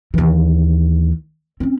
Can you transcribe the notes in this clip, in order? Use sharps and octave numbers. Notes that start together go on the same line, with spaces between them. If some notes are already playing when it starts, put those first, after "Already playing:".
D#2 E3
C4 C#4